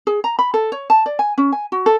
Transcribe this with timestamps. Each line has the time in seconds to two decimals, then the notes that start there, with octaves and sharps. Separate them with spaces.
0.07 G#4
0.24 A#5
0.39 B5
0.54 A4
0.72 C#5
0.90 A5
1.06 D5
1.19 G#5
1.38 C#4
1.52 G#5
1.72 F#4
1.86 A4